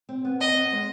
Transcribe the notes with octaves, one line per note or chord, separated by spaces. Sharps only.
C4
B3
C4 D#5
B3
G#3